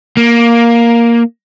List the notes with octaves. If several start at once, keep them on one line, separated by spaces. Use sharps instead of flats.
A#3